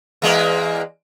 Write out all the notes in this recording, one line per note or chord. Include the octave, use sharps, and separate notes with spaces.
E2 G#3 A#3